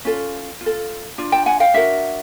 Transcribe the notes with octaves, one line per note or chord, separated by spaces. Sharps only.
C#4 F4 A4
F4
A4
D4 F4
G5 A5
F#5 G#5
F5 G5
D4 F#4 A#4 E5 F#5